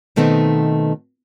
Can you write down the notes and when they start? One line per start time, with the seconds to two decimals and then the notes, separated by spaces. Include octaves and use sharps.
0.16 B2 D#3 A3 B3 C4 D#4